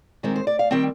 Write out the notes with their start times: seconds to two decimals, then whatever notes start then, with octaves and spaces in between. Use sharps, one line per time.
0.23 G#2 D#3 G#3 C4 A#4
0.36 C5
0.47 D5
0.59 F5
0.71 D#3 G3 C4 G5